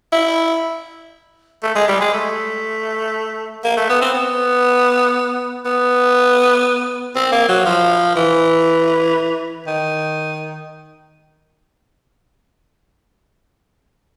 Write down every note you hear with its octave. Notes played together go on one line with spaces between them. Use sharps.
E4
A3
G#3
G3
G#3
A3
A#3
A3
B3
C4
B3
B3
C4
A#3
F#3
F3
E3
D#3